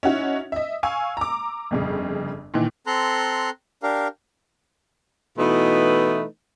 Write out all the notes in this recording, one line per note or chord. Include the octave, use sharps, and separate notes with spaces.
C#4 D#4 E4 F#4
D#5 E5
F5 G#5 C#6 E6
A#5 D6
G1 F2 C#3
A#2 D#3 E3
C4 A4 A#5 C6 F#6
D4 G4 A#4 F5
B2 E3 A3 D#4 E4 B4